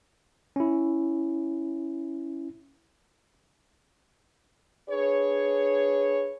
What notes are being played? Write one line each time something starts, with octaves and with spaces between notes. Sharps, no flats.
C#4 E4
D4 G#4 B4 C#5